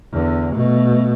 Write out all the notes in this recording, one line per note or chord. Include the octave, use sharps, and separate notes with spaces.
E2 D3
B2 A3